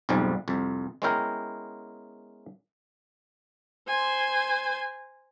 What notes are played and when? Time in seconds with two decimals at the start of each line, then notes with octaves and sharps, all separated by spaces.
0.09 B1 F2 G#2 F3 G3
0.48 C2 F2
1.02 G#3 B3 C#4 E4 A#4 G5
3.88 C5 G#5